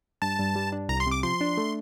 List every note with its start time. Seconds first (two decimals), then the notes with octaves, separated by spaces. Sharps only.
0.22 G2 A5
0.39 G2
0.55 G3
0.72 D4
0.89 C2 A#5
1.00 C6
1.06 C3
1.11 D6
1.23 F3 C6
1.41 D4
1.57 A3